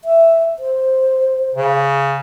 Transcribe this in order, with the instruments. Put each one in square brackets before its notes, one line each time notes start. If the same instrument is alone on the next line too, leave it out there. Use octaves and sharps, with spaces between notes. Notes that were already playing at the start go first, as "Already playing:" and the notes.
[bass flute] E5
C5
[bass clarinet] C#3